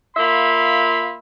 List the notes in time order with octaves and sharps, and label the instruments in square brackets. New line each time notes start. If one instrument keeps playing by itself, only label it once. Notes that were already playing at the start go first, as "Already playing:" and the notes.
[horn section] A#3 F4 E5 B5 C6